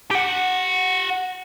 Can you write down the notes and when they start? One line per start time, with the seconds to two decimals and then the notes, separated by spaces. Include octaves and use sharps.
0.11 G4 F#5